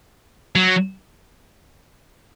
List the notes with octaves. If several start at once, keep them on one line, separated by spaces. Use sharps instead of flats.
F#3